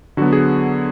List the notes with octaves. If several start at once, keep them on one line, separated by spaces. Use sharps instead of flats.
D3 F#3 B3 F#4
G#4